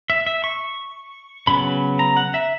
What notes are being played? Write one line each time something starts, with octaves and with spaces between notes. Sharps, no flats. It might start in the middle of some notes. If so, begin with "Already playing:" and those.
E5
E5
C#6
C#3 F#3 B3 B5
A#5
F#5
E5